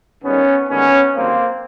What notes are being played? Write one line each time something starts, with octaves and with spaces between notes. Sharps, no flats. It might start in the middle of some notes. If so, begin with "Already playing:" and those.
G#1 G#2 D#3 G3 B3 C#4
D#2 D3 F3 G#3 B3 C#4
G#1 G2 D3 F#3 A#3 C4